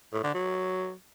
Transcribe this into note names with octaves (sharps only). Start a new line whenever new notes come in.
A2
D3
F#3